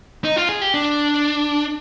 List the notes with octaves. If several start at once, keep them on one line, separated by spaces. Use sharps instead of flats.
D#4
F4
G#4
G4
D4